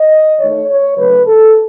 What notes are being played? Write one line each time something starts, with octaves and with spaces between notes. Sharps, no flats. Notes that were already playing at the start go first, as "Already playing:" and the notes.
Already playing: D#5
D#3 A3 C#5
C#5
C#3 F#3 A3 B4
A4